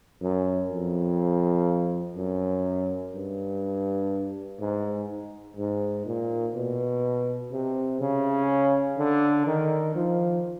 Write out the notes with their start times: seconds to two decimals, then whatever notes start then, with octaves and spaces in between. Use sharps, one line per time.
0.22 F#2
0.71 F2
2.16 F#2
3.14 G2
4.60 G#2
5.57 G#2
6.06 A#2
6.55 B2
7.52 C3
8.00 C#3
8.98 D3
9.47 D#3
9.95 F3